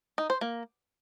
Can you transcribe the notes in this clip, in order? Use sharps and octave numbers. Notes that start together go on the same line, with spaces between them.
D#4
C5
A#3